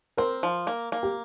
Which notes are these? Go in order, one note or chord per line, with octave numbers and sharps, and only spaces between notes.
C4 A#4
F3
A#3
A#3
G4